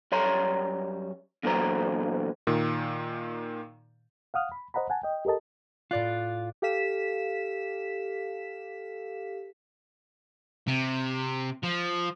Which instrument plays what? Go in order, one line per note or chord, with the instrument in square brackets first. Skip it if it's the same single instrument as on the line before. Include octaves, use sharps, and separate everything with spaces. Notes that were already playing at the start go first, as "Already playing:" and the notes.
[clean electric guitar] F#2 G3 C#5 A#5 C6
E2 A#2 D3 F#3 C5 A#5
[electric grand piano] A#2 D#3
[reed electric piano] F5 F#5 D#6 F6
B5
C5 D#5 F#5 A#5 B5
F#5 G#5 A5
D#5 G5
G4 A4 A#4 D#5 A5
[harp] A2 D5 F#6 [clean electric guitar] F4
[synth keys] G4 A4 F5 B6 E7
[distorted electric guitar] C3
F3